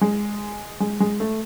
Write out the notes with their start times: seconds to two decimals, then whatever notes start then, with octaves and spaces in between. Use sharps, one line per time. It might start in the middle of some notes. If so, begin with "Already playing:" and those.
0.01 G#3
0.80 G#3
1.00 G#3
1.20 A3